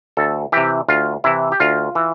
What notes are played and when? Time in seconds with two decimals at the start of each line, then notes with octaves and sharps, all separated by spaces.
0.17 D2 A4
0.52 C3 E3 G4
0.88 D2 F4
1.24 C3 E3 E4
1.52 G4
1.60 D2 F4
1.95 E3